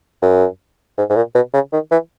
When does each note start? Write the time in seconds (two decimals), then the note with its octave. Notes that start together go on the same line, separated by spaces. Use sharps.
0.22 F#2
0.98 G#2
1.10 G#2
1.16 A#2
1.35 B2
1.54 C#3
1.73 D#3
1.91 E3